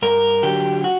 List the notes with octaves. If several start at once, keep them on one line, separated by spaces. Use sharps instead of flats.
G2 A#4
D3 F#3 G4
F#4